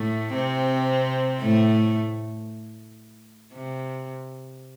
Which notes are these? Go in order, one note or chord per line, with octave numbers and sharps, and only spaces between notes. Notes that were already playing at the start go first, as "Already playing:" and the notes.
Already playing: A2 A3
C3 C4
A2 A3
C3